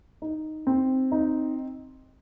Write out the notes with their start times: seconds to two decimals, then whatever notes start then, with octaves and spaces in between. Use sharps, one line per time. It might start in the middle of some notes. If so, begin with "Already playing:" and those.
0.22 D#4
0.67 C4
1.12 D#4